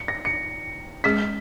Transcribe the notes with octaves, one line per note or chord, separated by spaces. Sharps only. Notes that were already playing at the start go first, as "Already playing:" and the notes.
Already playing: C#7
A#6
C#7
G#3 C#4 G#4 B6